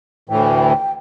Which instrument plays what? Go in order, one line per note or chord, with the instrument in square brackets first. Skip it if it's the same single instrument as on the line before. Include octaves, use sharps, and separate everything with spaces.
[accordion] D2 A2 E3 [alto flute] G5